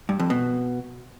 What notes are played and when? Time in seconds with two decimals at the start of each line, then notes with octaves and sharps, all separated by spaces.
0.09 G2
0.20 F2
0.30 B2